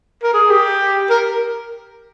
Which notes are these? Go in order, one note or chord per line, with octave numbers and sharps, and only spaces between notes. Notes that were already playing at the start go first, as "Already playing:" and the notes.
A#4
G#4
G4
A#4